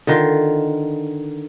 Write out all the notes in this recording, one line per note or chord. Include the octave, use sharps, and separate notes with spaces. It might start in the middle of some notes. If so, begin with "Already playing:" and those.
D3 D#3 F4